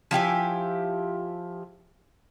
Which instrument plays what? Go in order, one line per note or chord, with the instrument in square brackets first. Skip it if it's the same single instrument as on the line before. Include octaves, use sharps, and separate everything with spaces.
[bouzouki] F3 E4 G4 G#5